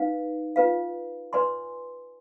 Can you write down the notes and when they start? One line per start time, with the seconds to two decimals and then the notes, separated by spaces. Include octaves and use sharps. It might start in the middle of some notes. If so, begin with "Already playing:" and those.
Already playing: D#4 B4 F5
0.56 F4 B4 F5
1.33 B4 D5 G#5 C6